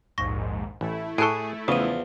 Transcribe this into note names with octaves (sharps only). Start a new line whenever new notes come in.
A#1 D#2 G#2 C#6 A#6
A1 A3 E4
A2 G#4 A4 C#6 F#6 D7
E2 C#3 F3 D#6 D#7